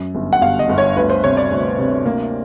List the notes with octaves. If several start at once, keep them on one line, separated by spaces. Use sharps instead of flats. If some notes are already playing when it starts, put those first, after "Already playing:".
Already playing: F#2
G1
F#5
G1 F5
D#5
G1
C#5
D2 B4
C5
C3 C#5
D5
D2
C3
A#3